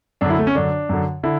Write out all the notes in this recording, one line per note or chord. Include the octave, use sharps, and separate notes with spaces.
F#2 D3 D4
E4
A3
C#4
F#2 D3 D4
F#2 D3
D3 E4